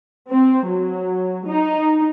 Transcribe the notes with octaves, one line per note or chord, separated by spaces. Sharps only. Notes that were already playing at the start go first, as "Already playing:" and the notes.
C4
F#3
D#4